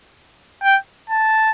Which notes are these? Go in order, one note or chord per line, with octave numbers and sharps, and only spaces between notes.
G5
A5